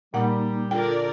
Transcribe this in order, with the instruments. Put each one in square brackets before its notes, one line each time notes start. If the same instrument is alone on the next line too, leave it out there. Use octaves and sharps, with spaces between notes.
[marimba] A#2 F#5 [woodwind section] G3 [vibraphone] A#3 D#4
[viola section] D3 A#4 D5 [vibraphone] F4 [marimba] G5